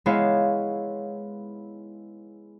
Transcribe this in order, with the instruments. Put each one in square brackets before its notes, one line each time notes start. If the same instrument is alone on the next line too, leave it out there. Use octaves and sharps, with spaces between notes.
[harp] G#3 B3 E4 C#5 F5